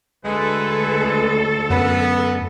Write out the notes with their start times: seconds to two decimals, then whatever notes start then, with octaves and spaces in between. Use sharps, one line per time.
0.25 D2 G#3 A4 B4
1.70 F#2 B3